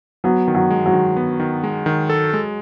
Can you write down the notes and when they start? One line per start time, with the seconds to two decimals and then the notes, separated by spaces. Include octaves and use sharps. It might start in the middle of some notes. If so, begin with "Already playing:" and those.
0.24 F#3 B3
0.48 D#3
0.55 F#3
0.71 G#3
0.86 F#3
0.93 D#3
1.17 B3
1.40 D#3
1.64 G#3
1.86 D#3
2.10 A4
2.33 G#3